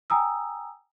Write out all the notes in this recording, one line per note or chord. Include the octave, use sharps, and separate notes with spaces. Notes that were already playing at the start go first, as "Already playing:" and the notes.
G5 G#5 A#5 D#6 E6